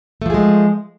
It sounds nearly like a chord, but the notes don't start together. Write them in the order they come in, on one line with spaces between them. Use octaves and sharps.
A3 F3 G#4 G#3